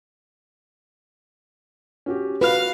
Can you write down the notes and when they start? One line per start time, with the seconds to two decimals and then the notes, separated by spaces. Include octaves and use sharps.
2.06 C#4 F#4 G4
2.41 F#4 B4 F5 F6